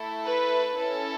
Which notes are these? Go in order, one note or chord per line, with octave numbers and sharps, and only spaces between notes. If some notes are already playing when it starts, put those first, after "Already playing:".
Already playing: A3 E4 A4
B4
C#4 E4 A4